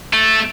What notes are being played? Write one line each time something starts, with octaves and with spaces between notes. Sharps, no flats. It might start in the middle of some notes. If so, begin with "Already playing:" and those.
A3